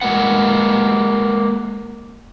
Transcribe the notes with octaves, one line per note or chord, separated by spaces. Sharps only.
G#3 A#3 F#4 B4 F#5